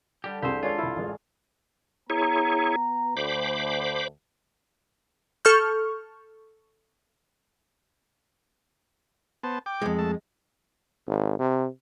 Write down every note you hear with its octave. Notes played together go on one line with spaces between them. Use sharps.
D3 G3 G4
C2 C4 G4 G#4 C5
G#3 C#4 D4 F4 A4 C#5 D5
C2 E4 F5
A1 C#3 G#3
B3 E4 G#4 C#5 A#5
D2 C5 B5 D6
A4 C#6 F6 G6
B3 C5 A5
G5 D6
F2 G#3
A3 A5
G#1
C3